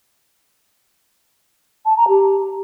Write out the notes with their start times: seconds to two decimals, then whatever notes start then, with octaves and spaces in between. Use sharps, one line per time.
1.86 A5
1.97 A#5
2.08 G4